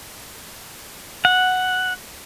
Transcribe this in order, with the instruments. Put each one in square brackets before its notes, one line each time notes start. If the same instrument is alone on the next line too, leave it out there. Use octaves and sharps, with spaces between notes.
[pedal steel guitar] F#5